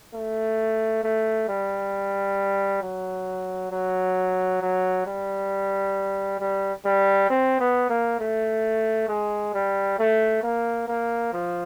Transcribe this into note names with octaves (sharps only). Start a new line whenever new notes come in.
A3
A3
G3
F#3
F#3
F#3
G3
G3
G3
C4
B3
A#3
A3
G#3
G3
A3
A#3
A#3
F3